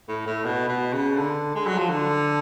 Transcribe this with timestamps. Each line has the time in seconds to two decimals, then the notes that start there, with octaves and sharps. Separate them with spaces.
0.09 A2
0.26 A2
0.45 B2
0.69 B2
0.93 C#3
1.17 D3
1.55 G#3
1.67 F#3
1.78 F3
1.89 D3